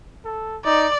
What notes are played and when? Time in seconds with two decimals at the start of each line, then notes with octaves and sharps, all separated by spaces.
0.25 A4
0.65 D#4 D5